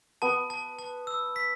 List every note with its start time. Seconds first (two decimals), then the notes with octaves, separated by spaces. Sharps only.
0.22 B3 A5
0.50 A5
0.79 A5
1.07 E6
1.36 B6